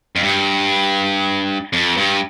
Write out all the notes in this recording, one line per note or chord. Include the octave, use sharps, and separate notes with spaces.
F2
G2
F2
G2